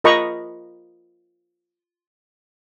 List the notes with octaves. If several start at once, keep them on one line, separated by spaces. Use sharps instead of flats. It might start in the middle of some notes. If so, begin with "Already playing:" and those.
F4 A#4 D#5 A#5 B5 C#6